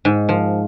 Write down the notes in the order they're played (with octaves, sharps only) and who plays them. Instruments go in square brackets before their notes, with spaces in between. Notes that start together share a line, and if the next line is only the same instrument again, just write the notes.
[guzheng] G#2
F3